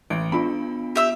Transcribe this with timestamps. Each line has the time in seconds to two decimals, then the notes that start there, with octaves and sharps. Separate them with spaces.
0.10 A1 D7
0.32 B3 D4 F4 B5
0.96 G4 E5 E6